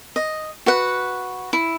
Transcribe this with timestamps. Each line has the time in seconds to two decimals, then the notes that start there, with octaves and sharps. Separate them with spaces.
0.16 D#5
0.66 F#4 B4 F#5
1.53 E4